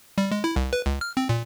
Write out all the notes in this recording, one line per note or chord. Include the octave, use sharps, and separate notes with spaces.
G3
G#3
E4
C2
B4
C#2
F6
C4
A#2